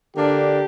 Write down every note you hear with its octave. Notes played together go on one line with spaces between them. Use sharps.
D3 A#3 D4 G4